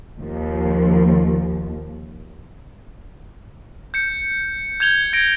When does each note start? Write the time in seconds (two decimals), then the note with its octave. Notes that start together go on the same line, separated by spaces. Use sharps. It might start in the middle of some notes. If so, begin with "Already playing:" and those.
0.19 D#2 F3
3.94 G6 C#7
4.80 G6 G#6 F7 G7
5.13 G#6 A#6 D7